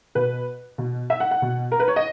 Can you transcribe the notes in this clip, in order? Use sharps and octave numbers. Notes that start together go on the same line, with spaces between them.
B2 B4
B2
E5
F#5
F#5
B2
A#4
B4
C#5
D#5